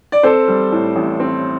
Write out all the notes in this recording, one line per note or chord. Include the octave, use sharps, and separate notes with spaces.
D5
C4 A4 C5
G3
A2
A1
C4